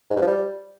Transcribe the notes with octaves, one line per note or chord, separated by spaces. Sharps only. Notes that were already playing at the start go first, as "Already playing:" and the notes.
G#2
G2
F3
G3